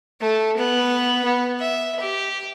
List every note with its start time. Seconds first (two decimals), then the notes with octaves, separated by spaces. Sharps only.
0.21 A3 A4
0.57 B3 B4
1.24 B3
1.60 E5
2.00 G4